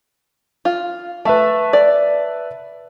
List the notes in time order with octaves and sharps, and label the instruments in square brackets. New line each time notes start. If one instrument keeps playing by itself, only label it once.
[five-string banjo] F4
[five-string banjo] A3 [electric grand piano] B4 E5 A5
[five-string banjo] D5